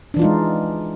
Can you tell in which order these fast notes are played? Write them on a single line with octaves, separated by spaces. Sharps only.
D4 E3 F4 D#4 G#3